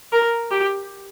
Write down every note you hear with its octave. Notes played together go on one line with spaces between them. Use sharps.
A#4
G4